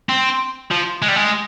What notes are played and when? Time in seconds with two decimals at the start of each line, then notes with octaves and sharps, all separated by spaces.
0.09 C4
0.71 F3
1.02 G#3
1.08 G3
1.16 G#3